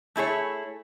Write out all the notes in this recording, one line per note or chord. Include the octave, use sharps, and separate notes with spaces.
A3 E4 G#4 C#5